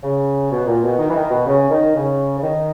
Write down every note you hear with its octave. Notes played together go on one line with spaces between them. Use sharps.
C#3
B2
A#2
B2
D#3
E3
D#3
B2
C#3
D#3
C#3
C#3
D#3